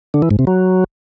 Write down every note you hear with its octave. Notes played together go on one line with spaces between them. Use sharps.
D3
E3
G#2
C3
F#3